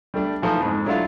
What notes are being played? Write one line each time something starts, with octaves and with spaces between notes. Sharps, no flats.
G3 A3 D4
E3 F3 A3 D#4
F2 G#2
F#3 A3 D4 E4 F4 F5